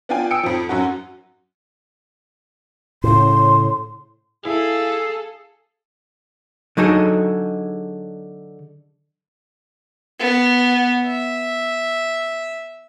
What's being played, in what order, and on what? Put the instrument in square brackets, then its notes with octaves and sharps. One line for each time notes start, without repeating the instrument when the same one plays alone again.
[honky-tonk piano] B3 D4 F4 G5 G#5
G5 D#6 E6 C#7 D7
F2 F3
F#2 F#3 C#4 F#4
[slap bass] A2 C#3 [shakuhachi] C6
[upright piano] E4 [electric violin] G#4 A4 [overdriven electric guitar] F5
[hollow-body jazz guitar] D3 F#3 D#4 G#4 A4
[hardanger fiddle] B3
E5